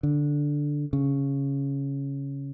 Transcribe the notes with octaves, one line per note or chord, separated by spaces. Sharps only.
D3
C#3